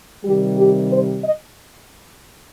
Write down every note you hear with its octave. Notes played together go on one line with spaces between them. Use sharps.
C3 D#3 G3 G4
G4
C5
D#5